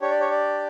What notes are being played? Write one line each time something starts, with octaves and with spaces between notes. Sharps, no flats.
D4 G4 C#5
D5
C#5
D5